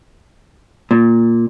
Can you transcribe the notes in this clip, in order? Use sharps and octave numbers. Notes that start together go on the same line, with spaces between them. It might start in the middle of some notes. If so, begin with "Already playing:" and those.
A#2